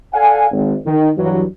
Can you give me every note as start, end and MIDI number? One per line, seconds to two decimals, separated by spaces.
0.13 0.46 69
0.13 0.46 74
0.13 0.46 77
0.13 0.46 78
0.13 0.46 80
0.51 0.74 32
0.85 1.09 51
1.16 1.42 43
1.16 1.42 52
1.16 1.42 54